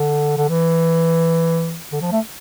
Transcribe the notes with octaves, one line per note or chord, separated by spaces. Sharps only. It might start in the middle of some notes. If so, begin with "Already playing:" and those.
Already playing: D3
D3
E3
D3
F3
A3